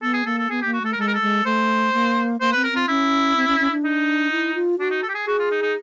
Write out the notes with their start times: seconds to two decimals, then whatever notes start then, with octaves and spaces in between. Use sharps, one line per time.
0.02 B3 A4
0.13 G#4
0.25 A#3 A4
0.38 A4
0.50 B3 G#4
0.62 A#3 G4
0.73 F#4
0.82 A3 A4
0.92 A#4
0.97 G#3 A4
1.07 A#4
1.14 A4
1.22 G#3
1.45 A3 C5
1.93 A#3
2.41 A#3 C5
2.52 C4 B4
2.64 A#4
2.72 C4 F4
2.88 C#4 E4
3.36 C4
3.48 C#4
3.60 C#4
3.71 D4
3.84 D#4
4.32 E4
4.55 F4
4.79 D4 F#4
4.90 D#4
5.03 A4
5.09 G4
5.14 G#4
5.26 F#4 G#4
5.39 F4
5.51 D#4
5.62 D#4